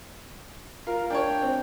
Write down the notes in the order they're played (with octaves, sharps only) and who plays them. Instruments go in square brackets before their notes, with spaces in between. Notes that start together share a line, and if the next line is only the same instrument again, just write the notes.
[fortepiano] F4 [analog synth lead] A#4
[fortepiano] D4 C#5 [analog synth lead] G5
[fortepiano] C4